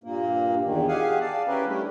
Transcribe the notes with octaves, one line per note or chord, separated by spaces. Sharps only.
G2 A#2 A#3
E2 D#3
G4 G#4 F5 F#5 G#5
D5 F5 A5
C#4 E4 G4 A#4 B4
G3 A3 D4